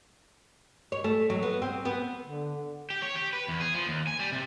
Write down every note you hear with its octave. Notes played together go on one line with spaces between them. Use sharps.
C#5
A3
F#3
B3
C4
B3
D3
G4
C#5
G4
B4
E2
G#4
F3
D#2
G#5
G3
C3